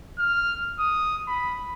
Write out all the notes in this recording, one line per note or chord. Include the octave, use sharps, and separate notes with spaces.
F6
D#6
B5